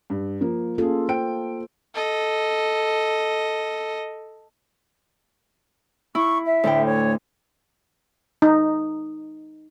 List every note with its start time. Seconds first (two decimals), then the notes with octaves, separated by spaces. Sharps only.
0.10 G2
0.41 F3 A#3
0.78 A#3 C#4 F4 G#4 A4
1.09 C5 G5 D7
1.94 A4 D#5
6.15 E4 C#6
6.45 E5
6.64 D2 A2 G5
6.85 C#5
8.42 D#4